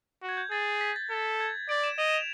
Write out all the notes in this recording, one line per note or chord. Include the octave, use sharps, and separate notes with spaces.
F#4
G#6
G6
G#4 A6
B6
A6
A4
G#6
D5 D7
E7
D#5 F7
E7
F7